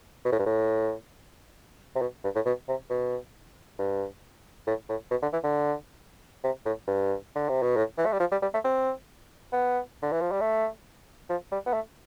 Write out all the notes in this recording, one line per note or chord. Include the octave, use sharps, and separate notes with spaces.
B2
A2
G2
A2
C3
B2
G2
A2
B2
C3
B2
G2
A2
A2
B2
D3
E3
D3
C3
A2
G2
D3
C3
B2
A2
E3
A3
G3
F3
G3
G3
A3
C4
B3
D3
E3
F3
G3
A3
F3
G3
B3
A3